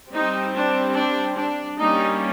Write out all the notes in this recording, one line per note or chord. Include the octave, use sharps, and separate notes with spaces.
G3 C4 D#4
D4
D4
D4
G3 A#3 C#4 D#4